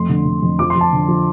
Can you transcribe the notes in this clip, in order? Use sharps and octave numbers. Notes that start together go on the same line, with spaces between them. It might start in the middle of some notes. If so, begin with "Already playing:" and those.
Already playing: F2 A3 C6
D3
D3
F2
F3 D6
C6
F3
A5
D3
F3